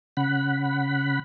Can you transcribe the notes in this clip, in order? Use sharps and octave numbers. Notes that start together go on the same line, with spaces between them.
C#3 F#5 B5